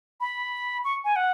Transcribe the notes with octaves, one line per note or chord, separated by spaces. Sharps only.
B5
C#6
G#5
F#5